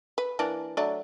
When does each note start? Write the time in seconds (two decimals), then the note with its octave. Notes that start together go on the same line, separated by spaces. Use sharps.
0.18 B4
0.39 E3 A#3 D4
0.77 F#3 A3 D4